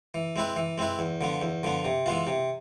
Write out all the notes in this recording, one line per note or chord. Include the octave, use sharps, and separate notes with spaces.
E3
G#3 C4 E4 B4
E3
G#3 C4 E4 B4
E2
D3 F3 B3
E2
D3 F3 B3
C3
E3 G#3 B3 F4
C3